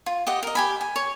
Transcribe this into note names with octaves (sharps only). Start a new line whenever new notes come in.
F4
G4 D#5 F#5
A#4 D#5
G4 G#5 B5
G#5
C#5